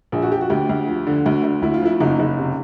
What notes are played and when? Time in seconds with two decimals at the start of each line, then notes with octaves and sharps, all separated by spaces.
0.12 A#1
0.22 F#4
0.32 F3 G4
0.41 F#4
0.50 D2 G4
0.69 D2
0.88 F3
1.07 D3
1.26 D2
1.43 D2
1.62 D2 E4
1.74 F4
1.82 F3 E4
2.00 F#1 D#4
2.19 F#1
2.38 C3